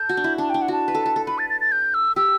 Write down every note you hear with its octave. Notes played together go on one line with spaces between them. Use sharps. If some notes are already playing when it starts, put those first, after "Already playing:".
Already playing: A4 G6
F#4
D4
E4
D4 A5
D4 G5
F#5
F#4 A5
B4
A4
A4
A4
B4 B5
A6
A6
A6
G6
E6
G4 E6